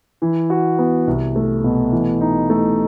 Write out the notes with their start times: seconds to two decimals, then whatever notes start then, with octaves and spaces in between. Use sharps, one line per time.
0.22 E3
0.50 F#4
0.78 B3
1.07 C2
1.36 A3
1.64 B2
1.92 E3
2.21 D#4
2.50 A3